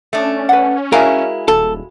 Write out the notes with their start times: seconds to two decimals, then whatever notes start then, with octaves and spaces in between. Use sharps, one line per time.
0.13 A3 C#4 D4
0.49 B4 F#5
0.92 G#3 E4 F#4 A#4 F5 G#5
1.48 D#1 A4